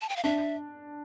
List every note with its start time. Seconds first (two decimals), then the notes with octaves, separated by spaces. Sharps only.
0.01 A5
0.09 G5
0.16 F5
0.24 D4 E5